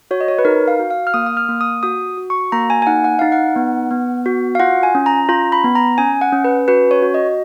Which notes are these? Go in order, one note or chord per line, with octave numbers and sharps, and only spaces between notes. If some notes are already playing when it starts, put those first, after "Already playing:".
F#4 C#5
D#5
C#5
B4
D#4 A#4
F5
F#4
F5
F6
A#3 D#6
D#6
F6
A#3
D#6
F#4 D#6
F#4
C#6
A#3 A#5
G#5
G#5
D#4 F#5
F#5
D#4 F5
F#5
B3
B3
F#4
F5
F4 F#5
G#5
C#4
A#5
F4 A#5
B5
B3
A#5
C#4 G#5
F#5
C#4
B4
F#4 B4
C#5
F#4
D#5